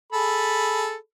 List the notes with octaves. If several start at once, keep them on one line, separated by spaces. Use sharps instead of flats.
G#4 A4 B5